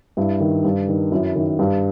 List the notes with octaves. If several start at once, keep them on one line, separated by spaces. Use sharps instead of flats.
G2 E4
D#3
G2
D#3
F#2 E4
D#3
G2